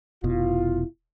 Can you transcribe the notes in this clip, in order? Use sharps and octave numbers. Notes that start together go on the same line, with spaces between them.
F1 B2 E4 F4